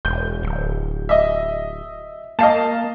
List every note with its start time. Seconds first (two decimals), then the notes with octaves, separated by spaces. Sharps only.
0.05 E1 G6
0.43 D1
1.09 D#5 E5
2.39 A#3 D#5 F5 A5